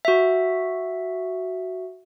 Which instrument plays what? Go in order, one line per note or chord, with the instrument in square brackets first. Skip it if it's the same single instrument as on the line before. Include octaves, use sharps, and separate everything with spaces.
[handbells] F#4 E5